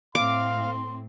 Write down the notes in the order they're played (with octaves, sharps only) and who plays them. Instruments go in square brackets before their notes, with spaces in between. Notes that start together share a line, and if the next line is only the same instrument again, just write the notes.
[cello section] A2 C4 [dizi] F5 [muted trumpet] C6 [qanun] D6